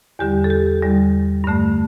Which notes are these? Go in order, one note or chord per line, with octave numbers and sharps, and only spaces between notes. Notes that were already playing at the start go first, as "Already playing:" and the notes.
E2 D3 G3 G4
A4
G4
E2 D3 G3
G2 D3 A3